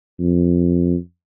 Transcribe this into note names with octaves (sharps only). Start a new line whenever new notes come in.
F2